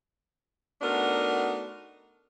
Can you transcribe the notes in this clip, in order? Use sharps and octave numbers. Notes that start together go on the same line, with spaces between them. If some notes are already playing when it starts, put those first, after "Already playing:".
A3 B3 D4 D#4 F#4 A#4